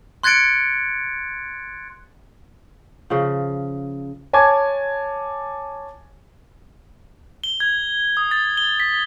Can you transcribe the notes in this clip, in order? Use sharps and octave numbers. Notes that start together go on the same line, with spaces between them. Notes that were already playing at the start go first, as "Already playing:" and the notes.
C6 F#6 G#6 A6 C#7 D7
C#3 F3
C#5 G#5 A5 D6 G#6
G7
G#6
D#6
A6
G7
B6